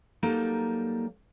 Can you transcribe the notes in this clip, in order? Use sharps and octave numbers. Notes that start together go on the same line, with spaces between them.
F#3 G3 A#3 D#4 A4